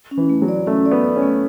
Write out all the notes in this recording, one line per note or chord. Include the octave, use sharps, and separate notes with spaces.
C#4
E3
A3
F#3
D5
A3 C#4
D5
B3
D5
C#4
A3